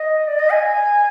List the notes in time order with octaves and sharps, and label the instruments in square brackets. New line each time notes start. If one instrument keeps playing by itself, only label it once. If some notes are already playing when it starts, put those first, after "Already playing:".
Already playing: [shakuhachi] D#5
D5
D#5
G#5